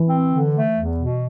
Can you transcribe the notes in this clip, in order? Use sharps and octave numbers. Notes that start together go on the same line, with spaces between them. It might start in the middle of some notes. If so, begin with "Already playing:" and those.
Already playing: E3
C4
D3
A3
E2
B2